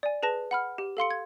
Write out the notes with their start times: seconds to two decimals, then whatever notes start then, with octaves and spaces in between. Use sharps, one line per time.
0.03 D5 G#5
0.23 G#4 B4 A5 A#6
0.51 F#5 B5 F6
0.78 G4
0.97 A4 F5 C6 C#7
1.10 G#6